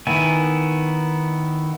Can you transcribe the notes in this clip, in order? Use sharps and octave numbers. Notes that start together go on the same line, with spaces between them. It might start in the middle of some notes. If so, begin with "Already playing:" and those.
D#3 B3 E4 G#5